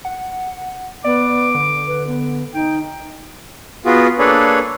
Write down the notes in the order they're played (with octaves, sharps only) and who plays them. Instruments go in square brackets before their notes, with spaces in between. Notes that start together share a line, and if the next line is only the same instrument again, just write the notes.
[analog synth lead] F#5
[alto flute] B3 [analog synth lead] D5 [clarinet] D6
[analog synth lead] D3
[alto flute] B4
B3
[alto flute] D#4 [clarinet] G5
[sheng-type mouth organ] B3 F4 F#4 G#4
A#3 D4 G#4 A4 B4 C#5